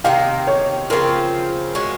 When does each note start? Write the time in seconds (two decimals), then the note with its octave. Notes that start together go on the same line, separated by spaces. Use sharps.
0.04 C3 D#3 A#3 F5
0.47 C#5
0.90 C#3 F3 C4 F4 A#4
1.75 G#3 C#4 F#4